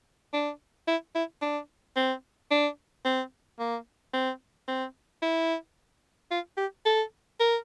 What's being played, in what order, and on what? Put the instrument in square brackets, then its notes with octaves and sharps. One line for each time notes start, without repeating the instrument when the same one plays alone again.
[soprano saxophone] D4
E4
E4
D4
C4
D4
C4
A#3
C4
C4
E4
F4
G4
A4
A#4